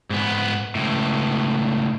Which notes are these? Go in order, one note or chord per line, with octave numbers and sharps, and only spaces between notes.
G#2 B3
C#2 A2